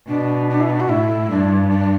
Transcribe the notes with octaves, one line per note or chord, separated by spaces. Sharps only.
B2 D4
D4
E4
D4
F#4
A2 E4
G2 D4
D4